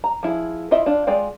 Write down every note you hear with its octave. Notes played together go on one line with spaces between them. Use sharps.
A#5
F3 E4 G#4
E4 F4 D#5 E5
D4 F4
G#3 F4 D5 G5